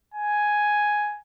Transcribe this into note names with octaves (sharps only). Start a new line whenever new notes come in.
G#5